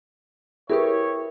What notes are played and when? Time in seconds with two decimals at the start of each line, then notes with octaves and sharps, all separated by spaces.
0.70 E4 G4 G#4 A#4 B4 C#5